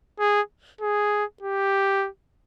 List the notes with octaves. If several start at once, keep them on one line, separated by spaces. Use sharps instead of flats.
G#4
G#4
G4